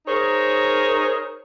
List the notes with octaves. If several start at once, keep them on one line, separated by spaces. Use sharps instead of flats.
D#4 G#4 A#4 C5 C#5